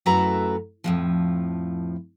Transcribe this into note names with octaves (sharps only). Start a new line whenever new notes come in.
F#2 A3 E4 F#4 B4 A#5
F2 A2 F3